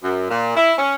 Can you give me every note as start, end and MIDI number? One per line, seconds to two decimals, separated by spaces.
0.03 0.28 42
0.29 0.55 46
0.57 0.72 64
0.78 0.95 61